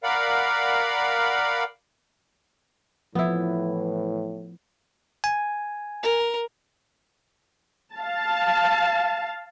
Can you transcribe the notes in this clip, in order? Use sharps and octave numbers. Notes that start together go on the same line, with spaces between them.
A#4 D5 F5 F#5 B5
A2 E3 F3 B3 E4
G#5
A#4
F5 A5